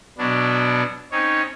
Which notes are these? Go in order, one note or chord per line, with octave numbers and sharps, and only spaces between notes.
B2 F#3 B3 D4
C4 C#4 D#4 C#5